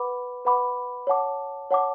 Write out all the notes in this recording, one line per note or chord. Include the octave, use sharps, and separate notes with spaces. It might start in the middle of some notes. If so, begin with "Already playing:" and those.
Already playing: B4 F#5 B5 D6
B4 F#5 B5 D6
C#5 F#5 A5 D6
C#5 F#5 A5 D6